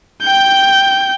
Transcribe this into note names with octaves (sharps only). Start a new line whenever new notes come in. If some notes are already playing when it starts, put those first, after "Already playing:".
G5 G6